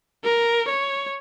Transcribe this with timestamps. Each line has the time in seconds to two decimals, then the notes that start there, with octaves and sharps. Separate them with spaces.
0.24 A#4
0.68 C#5